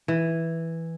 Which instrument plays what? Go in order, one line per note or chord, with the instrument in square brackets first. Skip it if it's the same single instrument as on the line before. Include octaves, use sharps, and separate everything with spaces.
[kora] E3